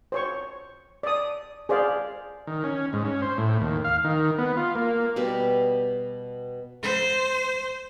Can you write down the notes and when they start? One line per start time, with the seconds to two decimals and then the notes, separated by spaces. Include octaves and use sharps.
0.12 C5 C#5 C#6
1.03 D5 D#6
1.69 G#4 C5 D5 F5
2.47 D#3
2.64 C#4
2.93 G#2
3.05 C#4
3.22 C5
3.38 A2
3.61 D#2
3.84 F5
4.05 D#3
4.38 B3
4.57 F4
4.75 A#3
5.16 B2 G3 B3 G4
6.83 C5